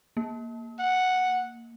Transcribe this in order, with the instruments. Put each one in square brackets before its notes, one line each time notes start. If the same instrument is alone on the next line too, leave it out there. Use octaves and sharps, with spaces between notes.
[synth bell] A#3
[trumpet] F#5